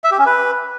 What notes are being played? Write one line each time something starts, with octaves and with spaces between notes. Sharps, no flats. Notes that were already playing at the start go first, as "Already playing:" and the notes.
E5
G4
C#4
B4